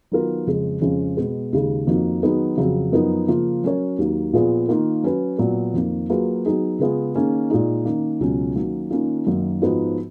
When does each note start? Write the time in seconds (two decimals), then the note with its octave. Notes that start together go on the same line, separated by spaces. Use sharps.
0.11 D#3 F#3 B3 F4 A#4
0.47 F2 C#3 G#3
0.82 F2 C#3 G#3 C#4 F4
1.17 B2 G#3 B3
1.53 D#2 C#3 G#3
1.87 F2 D#3 A#3 D#4 F#4
2.22 D#3 F#3 B3 D#4 G#4
2.57 F2 C#3 F#3
2.92 F#2 F3 B3 D#4 A#4
3.28 C#3 F3 A#3 F4
3.63 F#3 C#4 F#4 A#4 C#5
3.98 D#2 D#3 F#3 A#3
4.33 A#2 F3 B3 F4 G#4
4.69 D#3 A#3 F4 A#4
5.03 F#3 C#4 F#4 B4
5.39 A#2 F#3 B3 F#4
5.74 F2 D#3 A#3
6.09 F#3 A#3 F4 G#4 B4
6.45 F#3 B3 D#4 G#4
6.79 C#3 G#3 B3 F4 G#4
7.15 D#3 A#3 C#4 G#4
7.50 A#2 G#3 D#4
7.85 D#3 A#3 C#4
8.20 C#2 B2 F#3 C#4
8.56 D#3 F#3 A#3 C#4
8.91 D#3 A#3 C#4 F4
9.27 F#2 D#3 A#3 D#4
9.62 G#2 F3 B3 D#4 F#4